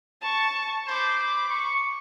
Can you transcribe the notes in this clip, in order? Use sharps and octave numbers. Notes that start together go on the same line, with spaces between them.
A5 C#6
C5 B5 D6
C#6